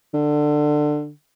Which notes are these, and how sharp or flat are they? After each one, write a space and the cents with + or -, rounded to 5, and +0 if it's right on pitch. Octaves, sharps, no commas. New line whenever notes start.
D3 +20